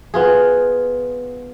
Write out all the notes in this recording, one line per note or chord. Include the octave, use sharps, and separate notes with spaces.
B3 F4 G#4